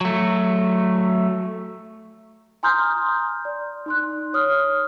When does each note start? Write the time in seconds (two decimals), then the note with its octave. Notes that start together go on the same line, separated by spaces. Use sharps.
0.01 F#3 A3
2.63 G#5 A#5 C6 D#6 F6 G6
3.45 D5
3.86 D#4 C6 F#6
4.33 C#5 D#6 F6